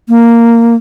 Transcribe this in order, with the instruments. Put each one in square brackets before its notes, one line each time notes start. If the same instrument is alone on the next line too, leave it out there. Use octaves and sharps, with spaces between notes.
[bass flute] A#3